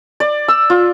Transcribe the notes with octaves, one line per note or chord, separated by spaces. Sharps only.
D5
E6
F4